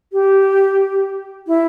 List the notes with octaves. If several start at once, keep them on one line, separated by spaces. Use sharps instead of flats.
G4
E4